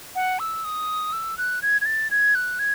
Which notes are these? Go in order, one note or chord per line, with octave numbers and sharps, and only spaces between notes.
F#5
E6
D#6
E6
F#6
G#6
G#6
A6
G#6
F#6
G#6